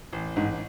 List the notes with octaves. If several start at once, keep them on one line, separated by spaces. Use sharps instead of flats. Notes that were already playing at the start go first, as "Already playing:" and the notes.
A1
A1 G#2